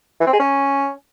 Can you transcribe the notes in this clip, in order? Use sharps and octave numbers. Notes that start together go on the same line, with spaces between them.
E3
C4
G#4
C#4